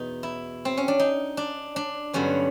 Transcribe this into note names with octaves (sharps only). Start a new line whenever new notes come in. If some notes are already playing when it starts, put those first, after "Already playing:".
Already playing: E2 B2 B3 D#4
E4
C4
C#4
D4
D#4
D4
D4
G2 D3 F#3 B3 C#4